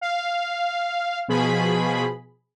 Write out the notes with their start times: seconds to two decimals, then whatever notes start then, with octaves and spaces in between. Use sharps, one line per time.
0.01 F5
1.28 B2 F3 G#4 B5